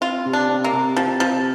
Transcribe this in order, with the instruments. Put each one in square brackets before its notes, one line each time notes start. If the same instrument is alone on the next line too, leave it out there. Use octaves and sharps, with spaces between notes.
[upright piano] C4 [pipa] F4
[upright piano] C3
[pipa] D4
[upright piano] C4
[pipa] A#3
[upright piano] C3
[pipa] F3 [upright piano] C4
[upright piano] C3 [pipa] F3